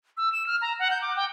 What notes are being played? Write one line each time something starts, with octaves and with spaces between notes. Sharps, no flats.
E6
E7
F6
A#5
F#5
G6
D6
G5